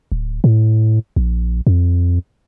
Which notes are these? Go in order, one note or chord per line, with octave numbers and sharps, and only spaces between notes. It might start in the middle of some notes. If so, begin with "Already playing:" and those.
D1
A2
A#1
F2